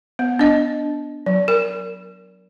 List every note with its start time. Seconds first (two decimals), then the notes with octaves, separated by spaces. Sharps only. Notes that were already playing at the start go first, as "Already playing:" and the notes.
0.19 B3
0.39 D4 D#5
1.26 F#3
1.48 A#4